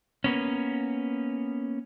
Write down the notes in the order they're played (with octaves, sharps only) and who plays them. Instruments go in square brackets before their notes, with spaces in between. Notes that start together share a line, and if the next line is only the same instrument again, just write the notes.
[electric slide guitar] A#3 B3 C#4